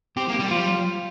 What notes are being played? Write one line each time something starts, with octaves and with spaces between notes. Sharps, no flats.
C4 G4
A#3
G4
G3
F3 F4
G3